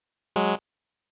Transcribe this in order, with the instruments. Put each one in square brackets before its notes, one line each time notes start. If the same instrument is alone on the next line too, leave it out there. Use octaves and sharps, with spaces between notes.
[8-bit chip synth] F#3 G#3